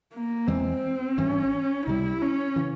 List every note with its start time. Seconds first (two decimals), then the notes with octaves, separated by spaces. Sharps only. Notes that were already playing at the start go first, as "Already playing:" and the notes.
0.14 A#3
0.47 E2 E3 G#3 C4
1.17 G#1 G2 E3 C#4
1.86 C#2 C3 E3 G3 E4
2.22 C#4
2.56 C#3 E3